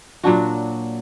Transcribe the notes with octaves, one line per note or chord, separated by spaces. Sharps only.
A#2 F#3 D4 F#4